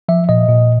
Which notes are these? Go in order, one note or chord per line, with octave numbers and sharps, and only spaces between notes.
F3 E5
A#2 D#5
A#2